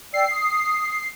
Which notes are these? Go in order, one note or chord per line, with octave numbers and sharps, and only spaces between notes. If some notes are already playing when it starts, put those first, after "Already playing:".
D5 G5 E6 C7
D#6